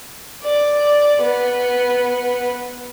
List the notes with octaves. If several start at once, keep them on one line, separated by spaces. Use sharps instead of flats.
D5
B3